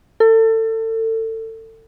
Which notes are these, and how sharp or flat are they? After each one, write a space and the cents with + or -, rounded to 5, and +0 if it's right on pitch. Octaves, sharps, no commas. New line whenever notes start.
A4 +30